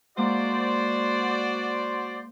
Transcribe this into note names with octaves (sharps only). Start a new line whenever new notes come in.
G#3 A#3 F#4 C5 D5